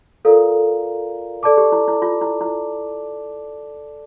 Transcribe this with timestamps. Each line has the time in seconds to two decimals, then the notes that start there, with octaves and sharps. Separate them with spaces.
0.25 F4 A4 A#4 D5 F5 A#5
1.43 A4 D5 A5 D6
1.57 G4
1.72 E4
1.88 E4
2.02 F4
2.21 E4
2.41 E4